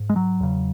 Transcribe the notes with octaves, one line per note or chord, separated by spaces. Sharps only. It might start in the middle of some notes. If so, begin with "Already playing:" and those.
Already playing: G#2
G#3
F#3
E2 C#3